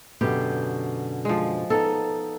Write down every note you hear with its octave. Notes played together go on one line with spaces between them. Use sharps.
F#2 B2 D3 G4
F3 G#3
B3 D#4 A4